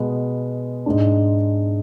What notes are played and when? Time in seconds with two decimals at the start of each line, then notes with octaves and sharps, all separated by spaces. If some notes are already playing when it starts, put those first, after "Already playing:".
Already playing: B2 G#3 B3
0.86 G#2 G#3 D4